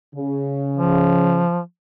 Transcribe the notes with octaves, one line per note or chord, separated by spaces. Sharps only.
C#3
F3